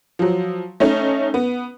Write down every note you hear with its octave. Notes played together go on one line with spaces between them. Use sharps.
F3 F#3
A3 C#4 D#4
B3